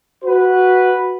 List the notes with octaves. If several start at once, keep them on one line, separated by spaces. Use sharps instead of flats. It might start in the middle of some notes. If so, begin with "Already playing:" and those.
F#4 B4